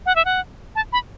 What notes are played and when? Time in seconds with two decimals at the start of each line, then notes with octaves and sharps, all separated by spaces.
0.06 F#5
0.16 E5
0.25 F#5
0.75 A5
0.93 B5